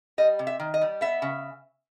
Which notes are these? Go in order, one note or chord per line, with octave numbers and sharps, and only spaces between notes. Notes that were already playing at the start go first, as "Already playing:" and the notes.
G3 D#5
C3
E5
D#3
D#5
G3
B3 E5
C#3